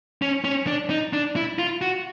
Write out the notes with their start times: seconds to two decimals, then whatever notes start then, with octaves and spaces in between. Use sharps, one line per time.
0.22 C#4
0.44 C#4
0.67 D4
0.90 D#4
1.13 D4
1.36 E4
1.59 F4
1.82 F#4